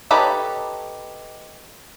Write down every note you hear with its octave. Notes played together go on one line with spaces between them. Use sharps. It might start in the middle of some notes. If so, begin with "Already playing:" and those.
D#4 G4 A4 B4 C#5